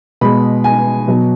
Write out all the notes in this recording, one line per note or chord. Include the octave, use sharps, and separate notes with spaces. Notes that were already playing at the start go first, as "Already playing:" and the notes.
B2 G#3 B5
G#5
B2 F#3